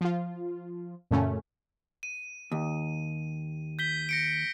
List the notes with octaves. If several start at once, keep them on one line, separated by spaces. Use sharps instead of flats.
F3 F4
F#2 A#2 C#3 A3 C#4
D#7
D#2
G6 B6 G7
A#6 C#7 D7